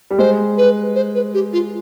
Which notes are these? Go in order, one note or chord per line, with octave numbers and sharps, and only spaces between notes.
G3
G#3 C5
B4
C5
B4
G4
F4